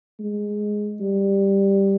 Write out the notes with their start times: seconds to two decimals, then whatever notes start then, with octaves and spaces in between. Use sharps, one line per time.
0.20 G#3
1.00 G3